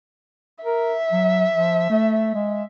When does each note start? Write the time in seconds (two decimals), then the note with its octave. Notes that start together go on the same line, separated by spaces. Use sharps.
0.65 A#4 E5
1.12 F#3
1.53 F3
1.90 A3
2.35 G#3